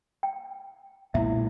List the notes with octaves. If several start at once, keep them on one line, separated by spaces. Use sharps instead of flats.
G5
B1 A#2 G#3 E4 E5